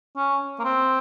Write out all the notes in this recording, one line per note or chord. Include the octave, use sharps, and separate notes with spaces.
C#4
A#3
C4